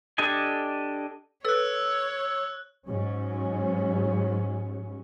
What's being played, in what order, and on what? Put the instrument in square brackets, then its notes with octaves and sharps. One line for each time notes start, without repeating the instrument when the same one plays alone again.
[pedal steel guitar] D4 G4 A4 D#5 G#5
[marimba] A4 B4 [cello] C#5 [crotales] E6 F#6
[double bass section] G#2 F#3 C#4